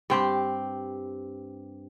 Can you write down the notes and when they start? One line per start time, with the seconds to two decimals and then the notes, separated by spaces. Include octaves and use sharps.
0.10 G2 C4 G4